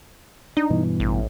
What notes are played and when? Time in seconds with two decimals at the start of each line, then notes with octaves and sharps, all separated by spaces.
0.57 D4 D#4
0.70 G2 B2 E3
1.00 A1